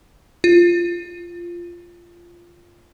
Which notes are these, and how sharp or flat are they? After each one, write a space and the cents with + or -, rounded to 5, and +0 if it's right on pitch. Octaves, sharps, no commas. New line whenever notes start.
F4 -10